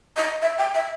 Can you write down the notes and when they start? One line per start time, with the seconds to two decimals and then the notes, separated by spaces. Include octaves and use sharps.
0.17 D#5
0.42 E5
0.58 G5
0.74 E5